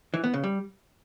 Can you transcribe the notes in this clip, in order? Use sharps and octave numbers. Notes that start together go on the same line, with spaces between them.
E3
B3
C#3
G3